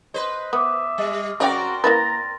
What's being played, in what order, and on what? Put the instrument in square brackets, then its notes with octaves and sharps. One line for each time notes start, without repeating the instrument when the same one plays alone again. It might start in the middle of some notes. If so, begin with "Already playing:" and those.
[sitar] B4 C5 [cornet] D#5
[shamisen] B3 [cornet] E5 [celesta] D6 D#6
[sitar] G3
[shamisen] C#3 F#3 G5 [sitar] C4 A#4 D5 [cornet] F#4
[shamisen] A#3 E4 B4 [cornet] A#5 [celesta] A6 A#6